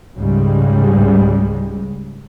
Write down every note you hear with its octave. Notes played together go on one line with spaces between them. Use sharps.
C#2 G#2 C#3 G3 G#3